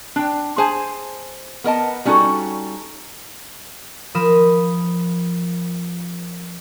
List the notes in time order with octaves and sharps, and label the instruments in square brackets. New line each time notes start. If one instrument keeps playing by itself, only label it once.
[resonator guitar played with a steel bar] D4 G5
G#4 C5 G#5 A5
B3 A#4 D#5 A5
G3 C#4 D#4 F#4 A4
[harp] F3 A#4 B5 D#6 F6 E7